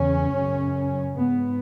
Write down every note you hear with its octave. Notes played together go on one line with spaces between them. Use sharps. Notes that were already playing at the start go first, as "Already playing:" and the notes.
Already playing: E2 C#3 C#4
F#2 C#3
G#2 B3